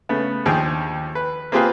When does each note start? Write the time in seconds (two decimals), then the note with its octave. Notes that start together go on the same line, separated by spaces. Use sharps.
0.09 C#3 A3 B3
0.46 D#2 F3 D4 G#4 G5
1.15 B4
1.52 A#3 C4 F4 G4 G#4 B4